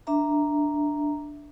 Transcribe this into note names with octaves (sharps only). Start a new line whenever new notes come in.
D4 E5 A#5